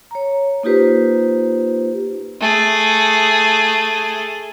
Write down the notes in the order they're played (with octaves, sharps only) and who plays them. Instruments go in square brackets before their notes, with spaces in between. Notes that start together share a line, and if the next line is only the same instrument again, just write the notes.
[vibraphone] C#5 A#5
A#3 D#4 F4 G4 B4 C5
[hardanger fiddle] A3 G#4